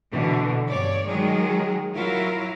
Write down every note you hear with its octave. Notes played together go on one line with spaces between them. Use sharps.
B2 D3 E3
G2 C#5 D5
D#3 F#3 G#3 G#4
F#3 E4 F4 A#4 E5 F5